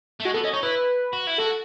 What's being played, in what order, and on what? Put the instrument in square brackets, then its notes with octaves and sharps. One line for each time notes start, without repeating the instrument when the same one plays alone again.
[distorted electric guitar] A3
[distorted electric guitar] G#3 [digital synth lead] F#4
[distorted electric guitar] B3 [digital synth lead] A4
[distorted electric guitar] C#4 [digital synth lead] D#5
[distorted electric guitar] D#4 [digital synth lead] C#5
[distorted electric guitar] E4 [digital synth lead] B4
[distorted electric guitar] F#4
E4
[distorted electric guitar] F#4 [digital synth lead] A4